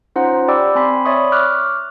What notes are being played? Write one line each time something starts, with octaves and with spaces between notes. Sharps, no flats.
C#4 D#4 F4 C5 F#5 A#5
G4 D5 G5 B5 D6 E6
C4 G#5 B5 C6 B6
C#5 D5 E5 B5 C#6 D#6
C#6 D6 F6 F#6